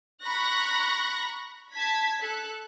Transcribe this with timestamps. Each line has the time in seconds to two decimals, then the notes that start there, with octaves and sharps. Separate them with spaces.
0.24 A#5 B5 C#6 F#6 A#6
1.74 A5 G#6 B6
2.22 A4 F#6